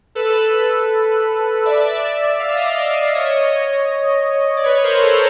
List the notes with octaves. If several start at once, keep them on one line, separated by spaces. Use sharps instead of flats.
A4 B4
D5 E5
F5
E5
D#5
D5 E5
E5
C#5 D#5
D5
B4 C#5
A#4 C5
A4 B4